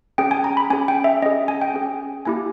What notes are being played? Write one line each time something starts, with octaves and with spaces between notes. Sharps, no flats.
C#4 G#4 G5
G#5
A#5
B5
C#4 G#4 G#5
G5
E5
C#4 G#4 D#5
G#5
G5
C#4 G#4
A#3 E4 G4 G#5